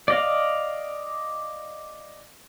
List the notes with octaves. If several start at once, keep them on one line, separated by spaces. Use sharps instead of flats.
D5 D#5 F5